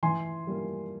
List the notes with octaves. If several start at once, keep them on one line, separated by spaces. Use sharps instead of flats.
E3 G#5 C6
G3 A#3